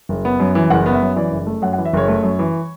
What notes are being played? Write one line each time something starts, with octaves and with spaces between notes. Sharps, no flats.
F#1
B3
F#2
E3
F#1 F#5
B3
E5
F#2
E3 D5
F#1
A3
F#2 F#5
F#5
E3
E5
F#1 C#5
A3
F#2
E3